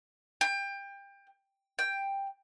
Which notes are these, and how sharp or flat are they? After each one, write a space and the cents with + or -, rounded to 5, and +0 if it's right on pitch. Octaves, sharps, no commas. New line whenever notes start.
G5 +25
G5 +10